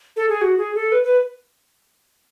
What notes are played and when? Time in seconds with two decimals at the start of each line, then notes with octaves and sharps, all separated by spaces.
0.16 A4
0.29 G#4
0.41 F#4
0.58 G#4
0.75 A4
0.92 B4
1.03 B4